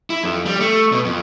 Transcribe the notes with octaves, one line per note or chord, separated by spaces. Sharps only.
E4
F2
G3
A3
B2
F2